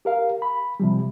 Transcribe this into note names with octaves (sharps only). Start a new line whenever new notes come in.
G4 A#4 F5
B5
C3 F3 G3